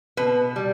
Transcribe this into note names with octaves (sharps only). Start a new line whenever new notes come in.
B2 B4
G3